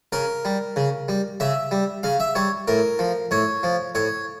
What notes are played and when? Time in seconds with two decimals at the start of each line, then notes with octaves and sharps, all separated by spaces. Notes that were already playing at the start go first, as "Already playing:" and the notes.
0.13 C#3 A#4
0.45 G3
0.76 C#3
1.09 G3
1.40 C#3 E5
1.71 G3
2.03 C#3 F5
2.20 E5
2.35 G3 C#5
2.68 A2 A#4
2.99 F3
3.31 A2 C#5
3.63 F3
3.95 A2 C#5